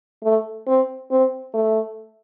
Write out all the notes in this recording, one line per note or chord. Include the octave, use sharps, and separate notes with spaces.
A3
C4
C4
A3